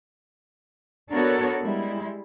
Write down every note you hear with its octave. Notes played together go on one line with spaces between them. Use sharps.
B3 D4 F#4 A4 A#4 C#5
G3 G#3 E4